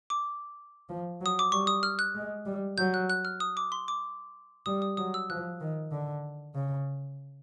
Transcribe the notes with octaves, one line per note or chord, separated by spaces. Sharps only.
D6
F3
F#3
D#6
D6
G3 C#6
D#6
F6
F#6
G#3
G3
F#3 G6
F#6
F#6
F6
D#6
D6
C6
D6
G3 D#6
D#6
F#3 D#6
E6
F3 F#6
D#3
D3
C#3